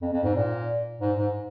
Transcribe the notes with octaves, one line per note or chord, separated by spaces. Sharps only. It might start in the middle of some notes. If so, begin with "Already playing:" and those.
F2
F2
G#2
A#2
G#2
G#2